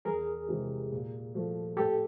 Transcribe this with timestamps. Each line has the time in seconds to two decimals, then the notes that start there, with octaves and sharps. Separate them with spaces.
0.05 E2 G#4 A#4
0.48 C3 E3 G#3
0.91 A#2
1.34 F3 A3
1.77 A2 G4 A4